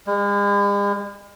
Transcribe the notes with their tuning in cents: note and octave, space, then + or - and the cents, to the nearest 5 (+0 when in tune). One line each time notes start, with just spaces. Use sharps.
G#3 -45